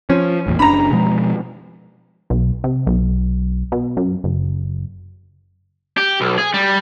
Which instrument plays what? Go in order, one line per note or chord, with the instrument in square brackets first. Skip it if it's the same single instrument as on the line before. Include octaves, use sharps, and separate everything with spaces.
[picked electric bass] F3 [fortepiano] C#4
[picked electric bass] A1 E2 A#2
[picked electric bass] F#1 C#3 D4 [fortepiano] A#5 B5
[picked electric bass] B2 F3 G#3
[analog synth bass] B1
C3
B1
B2
F#2
F#1
[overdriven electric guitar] G4
B1
G#4
G3